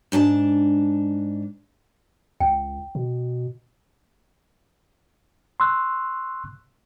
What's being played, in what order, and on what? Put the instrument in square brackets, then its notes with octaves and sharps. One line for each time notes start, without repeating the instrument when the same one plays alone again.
[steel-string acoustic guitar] G#2 D4 C5 A5
[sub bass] C#2 [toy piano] G5
[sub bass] B2
[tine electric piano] C6 C#6 E6 F#6